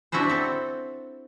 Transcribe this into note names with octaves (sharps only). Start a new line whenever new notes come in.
D4 E4 F#4 B4 C5
C4 A4